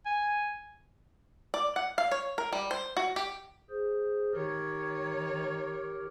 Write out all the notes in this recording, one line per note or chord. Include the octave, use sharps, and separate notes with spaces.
G#5
D5
F#5
F5
C#5
A#4
G3
C5
F#4
G4
G#4 C5
D#3 G4 A#4 C#5